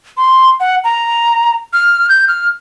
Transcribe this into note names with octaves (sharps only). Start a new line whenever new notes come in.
C6
F#5
A#5
F6
G6
F6